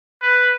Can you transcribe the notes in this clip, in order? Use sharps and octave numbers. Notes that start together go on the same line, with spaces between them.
B4